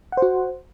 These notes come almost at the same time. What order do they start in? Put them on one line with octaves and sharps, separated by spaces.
F#5 C5 F#4